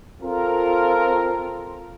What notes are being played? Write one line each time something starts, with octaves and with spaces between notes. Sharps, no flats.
C4 F4 A4 A#4